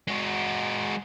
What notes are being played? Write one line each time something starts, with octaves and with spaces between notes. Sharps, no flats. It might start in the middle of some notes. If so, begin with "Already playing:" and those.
G#3 F#4